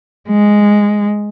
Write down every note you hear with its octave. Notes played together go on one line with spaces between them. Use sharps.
G#3